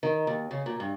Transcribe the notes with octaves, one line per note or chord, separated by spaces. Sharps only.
D#3
D#2
C#3
A#2
G2